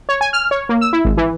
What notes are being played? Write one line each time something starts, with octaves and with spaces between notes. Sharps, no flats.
C#5
G#5
F6
C#5
A#3
E6
E4
G#1
E3